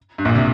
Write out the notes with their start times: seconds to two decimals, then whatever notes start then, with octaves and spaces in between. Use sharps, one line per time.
0.18 G2
0.25 A#1 A#2
0.35 C3